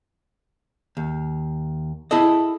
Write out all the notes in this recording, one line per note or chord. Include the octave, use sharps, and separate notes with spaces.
D#2
E4 G#4 A4 D#5